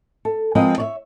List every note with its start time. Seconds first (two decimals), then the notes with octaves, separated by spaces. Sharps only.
0.25 A4
0.55 F3 G#3 B3 C4 A#4 D#5
0.78 C#5 D5 E5